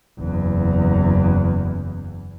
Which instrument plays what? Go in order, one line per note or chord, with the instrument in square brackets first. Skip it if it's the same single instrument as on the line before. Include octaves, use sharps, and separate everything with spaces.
[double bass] F#1 E2